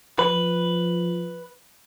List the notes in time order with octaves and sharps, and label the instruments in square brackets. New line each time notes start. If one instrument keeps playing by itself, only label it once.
[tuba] F3 [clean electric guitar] B4